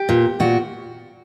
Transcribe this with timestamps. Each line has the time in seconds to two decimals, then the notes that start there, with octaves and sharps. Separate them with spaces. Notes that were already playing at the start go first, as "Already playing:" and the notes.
Already playing: G4
0.09 A#2
0.40 A#2 F#4